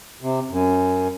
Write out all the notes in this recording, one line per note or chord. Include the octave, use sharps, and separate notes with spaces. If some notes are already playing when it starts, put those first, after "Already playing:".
C3
F#2